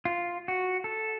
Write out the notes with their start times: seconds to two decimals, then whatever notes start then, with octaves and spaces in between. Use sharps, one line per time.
0.05 F4
0.48 F#4
0.84 A4